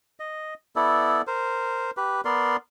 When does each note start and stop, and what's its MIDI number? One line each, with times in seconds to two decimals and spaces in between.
0.20 0.54 75
0.76 1.22 59
0.76 1.22 64
0.76 1.22 69
0.76 1.22 74
1.27 1.91 70
1.27 1.91 72
1.97 2.21 67
1.97 2.21 71
2.25 2.56 59
2.25 2.56 70
2.25 2.56 74
2.25 2.56 84